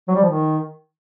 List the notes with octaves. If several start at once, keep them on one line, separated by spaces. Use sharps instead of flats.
F#3
G3
F3
D#3